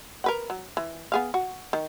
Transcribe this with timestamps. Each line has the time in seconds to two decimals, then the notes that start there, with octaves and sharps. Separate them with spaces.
0.24 A#4 B4 F#5
0.50 F#3
0.77 E3
1.12 B3 G#4 F5
1.34 F#4
1.73 D#3